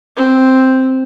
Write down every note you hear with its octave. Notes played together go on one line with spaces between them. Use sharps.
C4